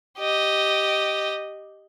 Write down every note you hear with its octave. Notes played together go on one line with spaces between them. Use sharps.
G4 D#5